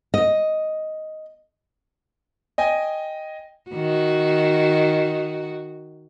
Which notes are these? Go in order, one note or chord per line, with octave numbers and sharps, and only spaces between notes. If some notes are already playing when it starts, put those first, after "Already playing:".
D#5
D#5 G5 G#5
D#3 F#4